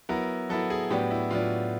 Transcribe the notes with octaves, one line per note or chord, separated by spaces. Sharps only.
F#3 B3 E4 A#4
F#3 B3 E4 A4
G#4
A2 F#3 B3 D4 G4
E4
A2 F#3 B3 D4 F4